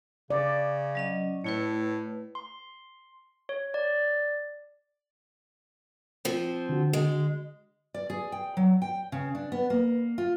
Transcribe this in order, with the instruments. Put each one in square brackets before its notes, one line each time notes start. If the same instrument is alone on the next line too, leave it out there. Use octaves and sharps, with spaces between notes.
[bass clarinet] C#3 [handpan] D5
[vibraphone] F#3 C#4 D#5
[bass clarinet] A2 [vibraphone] A3 E4 B4
[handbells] C6
C#5
D5
[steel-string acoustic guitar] F3 C4
[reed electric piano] D3 F#4
[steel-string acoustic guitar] G#3
D5
G#4
G5
F#3
G5
C#3
D4
B3
A#3
F4